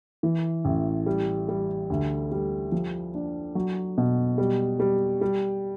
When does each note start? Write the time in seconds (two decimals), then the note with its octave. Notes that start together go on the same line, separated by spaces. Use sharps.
0.23 E3
0.65 A1
1.06 G3
1.49 G3
1.90 D2
2.32 G3
2.72 F3
3.15 D4
3.55 F#3
3.98 B2
4.38 G3
4.80 G3
5.21 G3